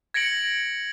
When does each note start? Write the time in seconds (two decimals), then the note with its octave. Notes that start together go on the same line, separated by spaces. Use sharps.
0.14 G#6 A#6 C#7 D7 F#7